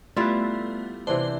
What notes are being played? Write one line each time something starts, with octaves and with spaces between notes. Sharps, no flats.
G3 A3 B3 E4 F4 E5
C3 E3 D4 C5